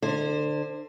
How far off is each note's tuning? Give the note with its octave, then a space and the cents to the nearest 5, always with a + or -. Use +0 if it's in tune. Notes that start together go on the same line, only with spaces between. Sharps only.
D3 +25 C5 +0